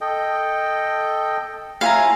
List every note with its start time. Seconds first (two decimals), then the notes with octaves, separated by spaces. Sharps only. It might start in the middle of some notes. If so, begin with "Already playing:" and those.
0.01 A4 D#5 G5
1.81 E4 F4 C#5 F5 G#5 A#5